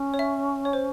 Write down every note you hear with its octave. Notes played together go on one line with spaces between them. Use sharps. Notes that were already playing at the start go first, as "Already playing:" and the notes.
Already playing: C#4
C#5
E5
C#5
C5